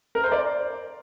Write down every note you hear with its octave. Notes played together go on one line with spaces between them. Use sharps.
A#4
C5
D5